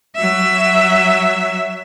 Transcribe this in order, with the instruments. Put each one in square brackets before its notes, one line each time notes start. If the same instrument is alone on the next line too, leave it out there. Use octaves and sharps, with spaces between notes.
[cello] F#3 E5